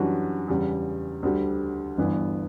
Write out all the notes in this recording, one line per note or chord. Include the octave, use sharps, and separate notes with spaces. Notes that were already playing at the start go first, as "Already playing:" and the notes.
Already playing: F#2 E3 G3 D4 F#4
E2 C#3 G3
D2 D3 G3
G1 G2 E3 B3